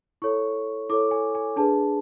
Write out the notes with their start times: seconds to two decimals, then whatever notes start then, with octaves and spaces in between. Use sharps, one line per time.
0.22 E4 A4 C#5 C#6
0.89 E4 A4 C#5 D6
1.11 G#5
1.35 G#5
1.56 D4 G#4 B4 A5